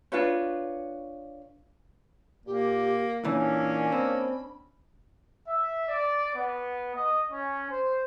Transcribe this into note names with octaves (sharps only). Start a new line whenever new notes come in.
D4 F4 B4 C#5
A#2 A#3 G4
A#2 E3 A#3 C#4 D4 G#5
C4 B5
E5
D5
B3
D#5
C#4
C5